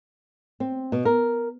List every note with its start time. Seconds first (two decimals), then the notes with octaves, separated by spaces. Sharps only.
0.60 C4
0.92 B2
1.05 A#4